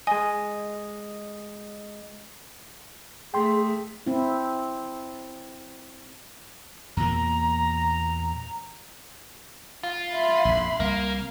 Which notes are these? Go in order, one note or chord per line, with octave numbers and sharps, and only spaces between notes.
G#3 D#5 G#5
A3 G#4 G5 C6
C4 E4
E2 A#2 A#3 A#5
F4
E5 B5 C6
A#1 F2 G#2
C2 A#3 F5